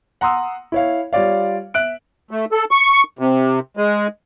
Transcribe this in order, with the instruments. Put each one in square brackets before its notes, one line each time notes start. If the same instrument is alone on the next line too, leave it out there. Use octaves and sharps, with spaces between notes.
[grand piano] F#5 A#5 C6 D#6 E6
E4 C#5 F5
G3 F4 C#5 D5 F5
E5 F#6 D7
[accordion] A3
A4
C#6
C3
G#3